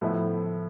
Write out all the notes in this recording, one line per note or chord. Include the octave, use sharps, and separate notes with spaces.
A2 F3 B3 E4